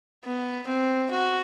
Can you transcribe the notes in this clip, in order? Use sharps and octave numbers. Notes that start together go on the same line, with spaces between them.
B3
C4
F#4